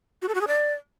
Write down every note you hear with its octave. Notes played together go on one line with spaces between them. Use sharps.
F#4
A4
F#4
G#4
D5